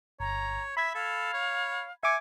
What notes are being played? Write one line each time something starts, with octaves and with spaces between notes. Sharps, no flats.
G1 C#5 A#5
E5 B5 G#6 B6
A4 F5
C#5
E5 G#5 D6 G#6 C#7